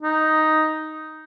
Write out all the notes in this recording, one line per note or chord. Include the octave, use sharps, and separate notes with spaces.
D#4